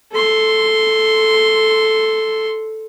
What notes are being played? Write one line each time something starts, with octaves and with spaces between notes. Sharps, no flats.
A4 C6